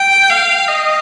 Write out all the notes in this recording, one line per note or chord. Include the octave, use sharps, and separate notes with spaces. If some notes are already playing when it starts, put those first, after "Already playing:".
Already playing: G5
F5
D#5